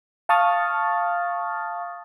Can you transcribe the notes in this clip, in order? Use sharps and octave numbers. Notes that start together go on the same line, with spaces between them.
F5 A5 C#6 D#6 F6 A6